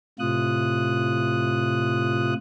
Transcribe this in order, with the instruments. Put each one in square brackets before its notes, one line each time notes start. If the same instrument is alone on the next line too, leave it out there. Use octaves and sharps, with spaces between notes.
[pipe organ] A2 C3 F4 D#6 F#6